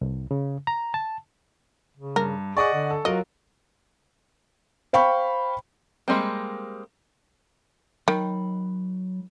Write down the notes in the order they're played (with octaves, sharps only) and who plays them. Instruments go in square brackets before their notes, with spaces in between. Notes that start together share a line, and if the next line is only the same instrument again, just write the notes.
[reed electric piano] C2
C#3
A#5
A5
[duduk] C#3
[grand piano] G2 [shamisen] A#4
[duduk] G#4 [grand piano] D5 D#5 F#5 [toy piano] G#5 C#6
[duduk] D3
[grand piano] A4
[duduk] F#3 [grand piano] F4 F#4 A#4 [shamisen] D#5
[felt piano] C5 F5 G5 B5 C#6
[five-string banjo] G3 G#3 A#3 C4
[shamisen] D#3 [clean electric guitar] F#3 B5